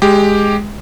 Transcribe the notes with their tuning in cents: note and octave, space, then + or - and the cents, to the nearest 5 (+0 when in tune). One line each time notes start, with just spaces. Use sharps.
G#3 +0 G4 +5